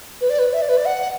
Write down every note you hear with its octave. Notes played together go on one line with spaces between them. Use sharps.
B4
D5
B4
E5
D5
B4
D5
F#5